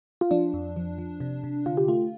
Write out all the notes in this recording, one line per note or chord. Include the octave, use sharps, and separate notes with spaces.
F4
F3 D4
F2
F3
F3
C3
C3
D3 F4
G4
A3 F4